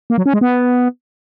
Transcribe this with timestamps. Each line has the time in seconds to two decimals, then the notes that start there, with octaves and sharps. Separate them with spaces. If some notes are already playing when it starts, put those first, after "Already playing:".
0.10 A#3
0.18 F#3
0.26 C#4
0.33 G#3
0.41 B3